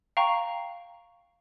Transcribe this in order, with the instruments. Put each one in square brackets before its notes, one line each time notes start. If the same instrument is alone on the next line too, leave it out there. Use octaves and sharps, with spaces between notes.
[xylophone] F5 G5 A#5 C#6